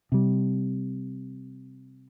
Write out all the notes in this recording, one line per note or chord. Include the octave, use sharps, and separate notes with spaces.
C3 G3